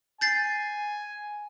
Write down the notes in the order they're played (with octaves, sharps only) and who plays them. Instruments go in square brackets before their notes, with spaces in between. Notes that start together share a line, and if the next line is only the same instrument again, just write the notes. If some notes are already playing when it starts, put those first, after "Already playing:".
[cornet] G#5 [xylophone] G6 A6 C7